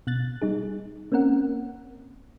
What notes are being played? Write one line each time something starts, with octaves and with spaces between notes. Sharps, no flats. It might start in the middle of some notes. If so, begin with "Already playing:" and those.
B2 F#6 A6
G3 D#4 G#4
A#3 C4 C#4 A#4 F#5